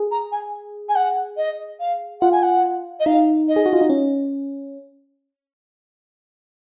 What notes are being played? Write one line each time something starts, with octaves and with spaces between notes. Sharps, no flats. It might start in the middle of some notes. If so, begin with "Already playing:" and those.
Already playing: G#4
A#5
G#5
G#5
F#5
D#5
F5
F4 F#5
G#5
F#5
D#5
D#4 F5
D#5
G#4
F#4
F4
D#4
C#4